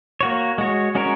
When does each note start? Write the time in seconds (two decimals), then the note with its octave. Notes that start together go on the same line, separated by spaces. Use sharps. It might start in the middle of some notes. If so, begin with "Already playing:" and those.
0.21 A#3 F#4 C#5
0.58 G#3 F#4 C#5
0.95 G#3 C#4 F#4 A#4 C#5